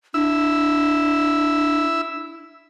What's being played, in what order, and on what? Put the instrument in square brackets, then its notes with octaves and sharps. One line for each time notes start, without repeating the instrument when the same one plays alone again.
[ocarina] D4 [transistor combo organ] E4 E6